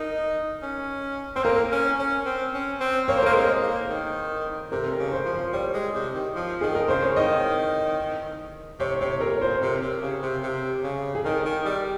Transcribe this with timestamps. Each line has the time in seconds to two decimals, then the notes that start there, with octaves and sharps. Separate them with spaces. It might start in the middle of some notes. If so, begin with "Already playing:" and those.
Already playing: D#4 A#4
0.63 C#4
1.36 C4 C5
1.44 A#3 A#4
1.72 C#4
1.99 C#4
2.26 C4
2.54 C#4
2.81 C4
3.08 A#3 C#5
3.16 C5
3.23 A#4
3.26 A#3
3.31 G#3 C5
3.63 A#3
3.90 D#3
4.72 C3 A#4
4.92 A#4
4.99 C#3
5.12 C5
5.26 F3
5.33 C5
5.53 G3 C#5
5.74 G#3
5.95 C3
6.14 D#3
6.35 F3
6.61 D#3 G#4
6.75 A#4
6.88 C#3 C5
7.02 C#5
7.16 D#3 D#5
8.80 C3 C#5
9.01 C3 C#5
9.21 A#2 A#4
9.41 A#2 C5
9.61 C3 A#4
9.82 C3
10.02 C#3
10.23 C3
10.43 C3
10.84 C#3
11.15 G#4
11.25 D#3 A#4
11.46 D#3
11.65 G3